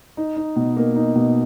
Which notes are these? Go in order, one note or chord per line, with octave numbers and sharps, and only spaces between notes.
D#4
D#4
B2
A#3
D#4
B2